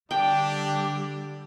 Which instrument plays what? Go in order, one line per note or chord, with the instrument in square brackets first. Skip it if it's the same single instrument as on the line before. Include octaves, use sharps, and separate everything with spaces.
[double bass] D3 G3 [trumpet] D4 [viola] G4 [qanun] G5